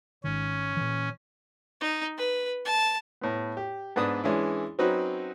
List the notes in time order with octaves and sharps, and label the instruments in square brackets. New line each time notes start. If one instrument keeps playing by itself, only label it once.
[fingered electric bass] G#1 D#3 [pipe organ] C#4
[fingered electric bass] A#2 E3
[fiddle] D#4
B4
A5
[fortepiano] A2 B3
G4
G#2 B3 D4 B4 D#6
E3 G#3 C#4 D4 E4
F#3 C4 C#4 D#4 F#4 B4